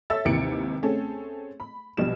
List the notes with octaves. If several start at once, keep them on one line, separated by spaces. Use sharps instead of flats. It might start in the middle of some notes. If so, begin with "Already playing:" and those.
A4 C#5 E5 E6 A6
G#1 D#2 C3 E3 C#7 D7
A3 C4 C#4 G#4 A4
B5
A#1 B2 G3 E7